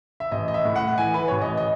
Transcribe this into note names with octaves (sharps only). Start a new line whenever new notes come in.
E5
A1 D#5
D#5
E5
A2
F#5
E3 G#5
B4
A1 C#5
D#5
D#5